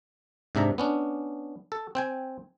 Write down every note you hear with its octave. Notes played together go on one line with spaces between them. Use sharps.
G#2 C3 D4 E5 A#5
B3 C#4 D4
A4
C4 G5 G#5